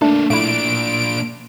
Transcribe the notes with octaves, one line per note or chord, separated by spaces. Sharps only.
A3 A#3 D4 A4
A#2 A3 D4 E4 D7